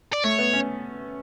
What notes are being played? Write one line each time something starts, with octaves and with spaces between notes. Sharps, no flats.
D5
A3 C#5
B3
C#4